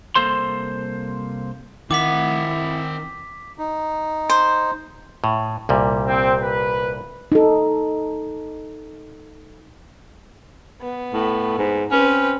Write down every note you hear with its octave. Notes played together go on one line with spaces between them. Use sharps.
C2 A#3 A4 C5 C6
D#3 C4 E4 F#5 D6 B6
D#4
C5
A2
C2 A#2 G3
C4
B4
D#4 A4
B3
A2
G#2
C4 C#4 B4